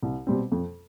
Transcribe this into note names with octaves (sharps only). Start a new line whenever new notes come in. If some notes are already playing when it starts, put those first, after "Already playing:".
C2
B2 G3 C4
F2